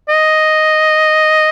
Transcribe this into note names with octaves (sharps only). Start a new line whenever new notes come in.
D#5